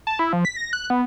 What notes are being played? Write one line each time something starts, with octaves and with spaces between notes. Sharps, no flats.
A5
E4
F3
B6
A#6
F#6
B3